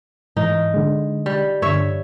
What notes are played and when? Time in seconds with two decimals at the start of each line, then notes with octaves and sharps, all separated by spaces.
0.37 G#2 E3 D#4
0.74 D3 G#3
1.26 G3
1.62 G2 D3 C#5 E5